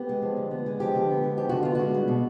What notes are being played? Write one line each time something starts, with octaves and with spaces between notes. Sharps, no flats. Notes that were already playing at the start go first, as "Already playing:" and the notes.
Already playing: B3 G4
G#3
F3
D3
B3
G#3
F3 G4
D3
B3
G#3
F3 G4
D3 F#4
B3 F4
G#3 F#4
G3
B2